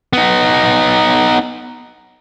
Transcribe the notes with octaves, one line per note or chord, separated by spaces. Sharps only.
B3 D#4